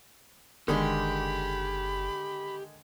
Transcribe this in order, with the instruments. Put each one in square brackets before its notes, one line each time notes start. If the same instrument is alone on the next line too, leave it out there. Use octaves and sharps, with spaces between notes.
[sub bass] F#1 [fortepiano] D3 D#3 G#3 [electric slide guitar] G4 [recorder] B5